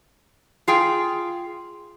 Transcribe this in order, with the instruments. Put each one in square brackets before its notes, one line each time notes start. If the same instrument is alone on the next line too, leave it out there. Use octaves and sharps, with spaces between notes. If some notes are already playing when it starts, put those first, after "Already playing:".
[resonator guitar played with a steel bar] F4 G#4 G5